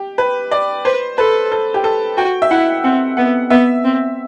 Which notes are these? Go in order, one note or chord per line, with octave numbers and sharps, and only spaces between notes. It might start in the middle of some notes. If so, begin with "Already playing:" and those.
Already playing: G4
B4
D5
B4 C5
A4 B4
A4
G4
A4
F#4 G5
E5
E4 F#5
C4 F#5
B3 F#5
B3 E5
C4